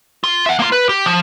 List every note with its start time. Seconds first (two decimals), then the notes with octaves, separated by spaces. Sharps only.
0.24 F4
0.46 E5 F#5
0.59 A#3 F4
0.72 B4
0.89 G4
1.06 F3